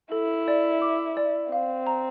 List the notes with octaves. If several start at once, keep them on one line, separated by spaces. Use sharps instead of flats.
E4 A4
D5
D6
D5
C4 F5
A#5